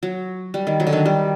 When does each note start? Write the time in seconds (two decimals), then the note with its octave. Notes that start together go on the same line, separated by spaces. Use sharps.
0.03 F#3
0.54 G3
0.67 D#3
0.80 F#3
0.87 D3
0.93 D#3
1.06 G3